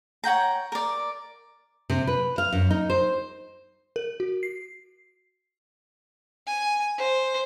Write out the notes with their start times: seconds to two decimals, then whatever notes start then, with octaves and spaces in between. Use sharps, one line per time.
0.24 C#5 F#5 G5 A#5
0.72 A#4 D5
1.90 C3
2.07 B4
2.38 F5
2.52 F#2
2.70 D#4
2.90 C5
3.96 A#4
4.20 F#4
4.43 C7
6.47 G#5
6.98 C5